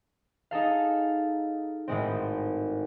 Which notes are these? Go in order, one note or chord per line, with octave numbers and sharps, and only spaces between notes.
D#4 G#4 A4 F5
G#1 A2 G#3 C4